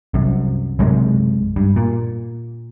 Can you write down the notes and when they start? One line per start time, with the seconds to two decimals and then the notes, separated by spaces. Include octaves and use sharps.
0.14 C2 F#2
0.79 B1 F#2 C3 G#3
1.56 G2
1.76 A#2